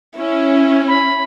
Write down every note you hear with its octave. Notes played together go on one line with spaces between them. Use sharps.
C#4 E4
B5